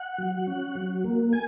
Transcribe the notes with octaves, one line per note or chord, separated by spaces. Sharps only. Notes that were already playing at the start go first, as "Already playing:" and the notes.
Already playing: F#5
F#3
C#4
F#3
A#3
G#5